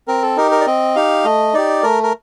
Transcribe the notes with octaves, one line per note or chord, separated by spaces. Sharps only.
C4 A#4
A4
D#4 G4 A#4
A#4
D5
C4 D#5
D#4 G4 F5
A3 D#5
D#4 G4 D5
A3 A#4
A#4